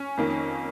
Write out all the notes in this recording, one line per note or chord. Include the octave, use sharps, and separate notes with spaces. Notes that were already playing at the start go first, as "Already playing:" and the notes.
Already playing: C#4
F2 D#3 A#3